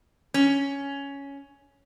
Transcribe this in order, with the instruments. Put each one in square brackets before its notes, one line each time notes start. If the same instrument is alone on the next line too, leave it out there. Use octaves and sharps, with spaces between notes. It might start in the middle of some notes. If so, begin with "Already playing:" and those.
[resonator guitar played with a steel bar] C#4